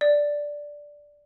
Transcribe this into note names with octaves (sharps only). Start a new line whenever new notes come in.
D5